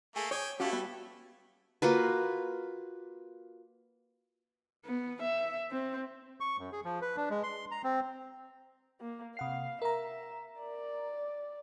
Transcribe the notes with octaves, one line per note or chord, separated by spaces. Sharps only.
A3 A#3 G#4
C#5 G5 G#5 D6 D#6
A3 C#4 E4 F#4 G4 A4 F5 D6
G3 B3 A5
A#3 F4 F#4 B4
B3
E5
C4
C#6
F#2
G#4
F3
B4
D4
G#3
C6
A#5
C4
A#3
C3 F5 F#5 C7
A#4 E5 A#5
D5